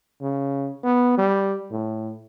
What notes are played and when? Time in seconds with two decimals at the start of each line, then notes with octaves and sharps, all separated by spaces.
0.21 C#3
0.84 B3
1.18 G3
1.71 A2